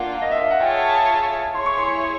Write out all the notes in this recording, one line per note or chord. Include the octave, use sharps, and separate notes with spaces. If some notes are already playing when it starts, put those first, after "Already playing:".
Already playing: A#3 D4 F4 F#5
D#5
E5
F5
F#5
F4 G#4 C#5 E5 G5 A5
E4 G#4 C#5 C6
C#6
C6